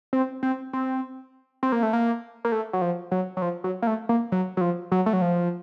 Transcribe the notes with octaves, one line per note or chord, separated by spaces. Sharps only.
C4
C4
C4
C4
A#3
A3
A#3
A#3
A3
F#3
F3
F#3
F#3
F3
F#3
A#3
A3
A#3
F#3
F#3
F3
F#3
A3
F#3
F3